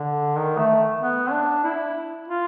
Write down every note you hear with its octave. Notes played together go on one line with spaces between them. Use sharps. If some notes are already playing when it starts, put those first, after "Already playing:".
Already playing: D3
D#3
A3
B3
D4
E4
F4